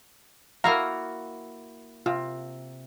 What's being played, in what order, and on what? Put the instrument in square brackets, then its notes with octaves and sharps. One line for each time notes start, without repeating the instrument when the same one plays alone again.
[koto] A#3 E4 F#4 [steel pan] F5 A#5
[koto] C3 [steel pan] F4